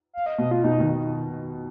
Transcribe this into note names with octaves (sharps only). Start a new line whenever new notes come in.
F5
D#5
B2 D#5
F4
B2 D#4
B2 D#3